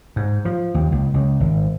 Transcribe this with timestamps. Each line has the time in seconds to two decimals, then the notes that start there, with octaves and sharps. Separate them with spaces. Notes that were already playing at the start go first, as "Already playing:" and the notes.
0.16 G#2
0.45 F3
0.74 D#2
0.92 C#2
1.14 C#2
1.40 G#1